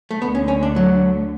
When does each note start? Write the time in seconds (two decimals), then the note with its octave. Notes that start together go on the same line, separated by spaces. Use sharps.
0.11 A3
0.22 D2 D3 A3 B3
0.35 C#4
0.48 C#4
0.63 D4
0.76 F#3